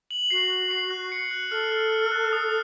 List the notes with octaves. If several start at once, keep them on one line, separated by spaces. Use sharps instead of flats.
F#7
F#4 C7
F#7
C7
F#6
C#7
F#6
A4 F6
F6
F6
F#6
D#6